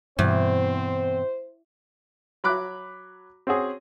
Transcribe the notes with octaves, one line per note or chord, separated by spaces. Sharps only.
E2 G2 B2 C4 C5
F#3 B5 D6 F#6
C4 C#4 F#4 G#4